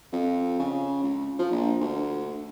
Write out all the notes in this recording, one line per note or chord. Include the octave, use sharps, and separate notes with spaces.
F2
C#3
C#2
F3
A#1
D2